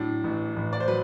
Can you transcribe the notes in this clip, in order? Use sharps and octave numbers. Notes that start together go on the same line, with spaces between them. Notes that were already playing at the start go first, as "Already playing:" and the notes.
Already playing: A2 F#3 D4
A1
A1
D5
C5
F#3 B4